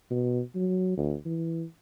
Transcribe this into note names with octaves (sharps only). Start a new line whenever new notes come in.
B2
F#3
D2
E3